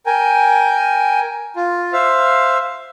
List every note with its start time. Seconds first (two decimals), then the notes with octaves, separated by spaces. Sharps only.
0.06 A#4 G5 G#5
1.56 F4
1.93 C5 E5 F5